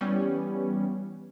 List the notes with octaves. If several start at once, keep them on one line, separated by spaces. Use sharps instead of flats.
E3 G3 B3 C#4